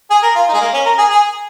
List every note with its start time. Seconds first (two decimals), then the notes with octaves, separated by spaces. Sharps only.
0.11 G#4
0.23 A#4
0.36 F4
0.49 D#4
0.54 G#3
0.61 A#3
0.74 C#4
0.86 A#4
0.98 G#4
1.10 G#4